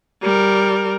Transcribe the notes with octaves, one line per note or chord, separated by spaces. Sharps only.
G3 A#4